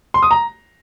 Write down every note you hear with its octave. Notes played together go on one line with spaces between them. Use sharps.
C6
D#6
A#5